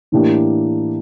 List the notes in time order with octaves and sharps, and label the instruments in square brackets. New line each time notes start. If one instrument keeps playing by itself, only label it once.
[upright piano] A2 E3 A#3 D4 G4